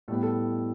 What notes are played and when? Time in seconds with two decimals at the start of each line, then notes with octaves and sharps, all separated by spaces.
0.08 A2 G3 A3 B3 A4
0.23 A4